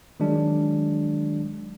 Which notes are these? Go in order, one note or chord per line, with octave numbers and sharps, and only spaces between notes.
D#3 F#3 G#3 D4